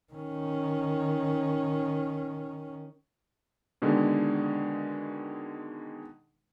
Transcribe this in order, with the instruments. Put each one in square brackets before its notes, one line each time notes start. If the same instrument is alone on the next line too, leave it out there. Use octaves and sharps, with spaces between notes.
[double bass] D#3 C#4
[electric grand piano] B2 D3 D#3 G#3